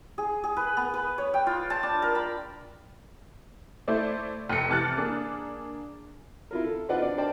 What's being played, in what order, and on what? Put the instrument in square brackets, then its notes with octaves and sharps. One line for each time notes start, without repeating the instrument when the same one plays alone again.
[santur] G#4
G#4
B4
B3
B4
C#5
G5
F4
A5
D4
A#4
B5
[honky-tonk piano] A3 E4 A4 C5 D5
F1 G5 C#7
C3 E3 A5 F6 F#6 A6
A#3 D4 G#4
[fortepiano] E4 F4 A#4
A4
C4 D#4 F4 B4 D5 F#5
D4 D5
A#4 C5 D5 G5 A5